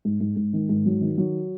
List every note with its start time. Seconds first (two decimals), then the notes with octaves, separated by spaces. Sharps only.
0.05 G#2
0.21 G#2
0.36 G#2
0.53 D#3
0.69 G#2
0.86 F#3
1.01 D#3
1.18 F#3